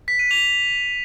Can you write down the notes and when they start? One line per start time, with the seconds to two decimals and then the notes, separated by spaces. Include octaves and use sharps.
0.08 B6
0.19 D#7
0.31 F7